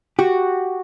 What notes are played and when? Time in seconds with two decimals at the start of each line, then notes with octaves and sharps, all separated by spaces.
0.19 F#4 G4